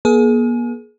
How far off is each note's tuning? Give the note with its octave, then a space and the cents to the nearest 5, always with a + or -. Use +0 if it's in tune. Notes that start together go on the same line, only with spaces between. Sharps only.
A#3 +45 G#4 +25